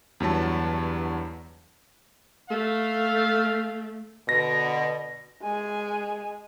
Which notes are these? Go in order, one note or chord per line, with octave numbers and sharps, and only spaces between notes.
E2 G2 F#3 A5
A3 F5
B2 D3 A#6
G#3 G#5